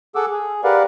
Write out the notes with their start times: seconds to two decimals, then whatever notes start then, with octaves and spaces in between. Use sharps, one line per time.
0.15 G#4 A4 F#5 D6 E6
0.32 G#4
0.64 G4 A#4 B4 D5 F5 F#5